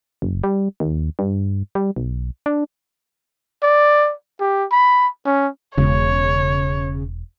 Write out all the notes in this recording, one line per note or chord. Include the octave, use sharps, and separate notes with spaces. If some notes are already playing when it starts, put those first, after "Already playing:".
F#1
G3
D#2
G2
G3
B1
D4
D5
G4
B5
C#4
E1 C#3 C#5